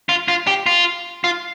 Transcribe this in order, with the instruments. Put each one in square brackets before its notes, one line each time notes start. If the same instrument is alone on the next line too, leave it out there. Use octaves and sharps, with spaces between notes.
[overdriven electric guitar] F4
F4
G4
F4
F4